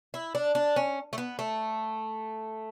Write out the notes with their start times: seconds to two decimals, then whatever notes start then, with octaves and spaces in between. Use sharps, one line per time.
0.14 E4
0.35 D4
0.55 D4
0.76 C#4
1.13 A3
1.18 B3
1.39 A3